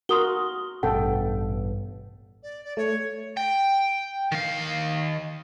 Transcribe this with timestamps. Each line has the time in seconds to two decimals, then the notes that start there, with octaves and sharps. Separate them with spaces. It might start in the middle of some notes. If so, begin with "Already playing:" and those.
0.09 F#4 A#4 C6 D#6 G7
0.83 A1 G2 B2 A4 F#5 G5
2.43 D5
2.64 D5
2.77 A3 C#5
3.37 G5
4.32 D#3 F5